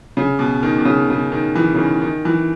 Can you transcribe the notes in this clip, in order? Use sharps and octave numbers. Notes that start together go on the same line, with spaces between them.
C#3
B2
D#3
B2
C#3
C#3
D#3
E3
C#3
D#3
D#3
E3